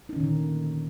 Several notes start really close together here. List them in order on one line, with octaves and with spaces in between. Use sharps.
D#4 C#4 D#3 A#2 D3